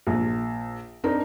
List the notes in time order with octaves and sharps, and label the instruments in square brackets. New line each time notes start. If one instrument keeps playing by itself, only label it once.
[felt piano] A#1
C4 D4 D#4 A#4